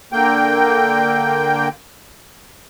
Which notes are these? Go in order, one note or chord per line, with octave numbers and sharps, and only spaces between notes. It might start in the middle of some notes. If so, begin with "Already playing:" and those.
D3 A#3 G5